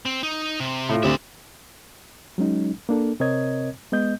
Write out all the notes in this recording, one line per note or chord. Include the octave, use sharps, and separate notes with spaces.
C4
D#4
C3
A2 F4
D2 C4 G4 D5 E5
F#3 G#3 C#4 D#4
A#3 D4 A4
C3 C4 A#4 C#5 D#5 G#6
G#3 B3 D#5 G6